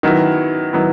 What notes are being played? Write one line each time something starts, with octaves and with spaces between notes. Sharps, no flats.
D#3 F#3 B3 E4
D#3 F#3 B3 E4